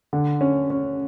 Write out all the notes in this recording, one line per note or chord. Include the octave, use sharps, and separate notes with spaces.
D3
C#4
C#4